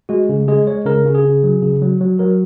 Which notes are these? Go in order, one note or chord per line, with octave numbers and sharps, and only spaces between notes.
G#3 F#4
C#3
G#3 G#4
G#3 C#5
C#3 A#4
C#3
G#4
C#3
F#3
C#3
F#3
F#3
F#3 A#4